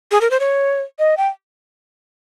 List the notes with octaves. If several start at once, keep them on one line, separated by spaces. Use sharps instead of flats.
G#4
A#4
C5
C#5
D#5
G5